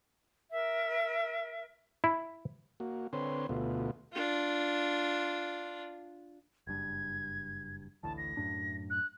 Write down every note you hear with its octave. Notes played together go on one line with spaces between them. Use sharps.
A#4 E5
E4
A#3 F#4
D3 C4 B4 C#5 C6
D2 B2 A3 B3 F4
D4 F4
F#1 G2 G#6
A1 D2 A2 A5
A#6
F#2 A2 D4
F#6